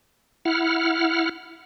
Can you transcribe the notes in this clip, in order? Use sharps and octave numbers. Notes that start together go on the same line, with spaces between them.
E4 F#5 F6